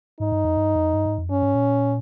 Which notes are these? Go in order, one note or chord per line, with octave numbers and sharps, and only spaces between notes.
G#2 D#4
G2
F2
G2
F2
G2
G#2
F2
G2 C#4
G#2
A#2